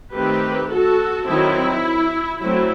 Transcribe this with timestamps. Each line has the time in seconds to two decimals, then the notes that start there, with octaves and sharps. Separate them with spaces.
0.14 D#3 A3 C4 G4 B4
0.70 F#4 A4
1.27 D#3 F#3 C4 E4
2.41 F#3 A3 C4 E4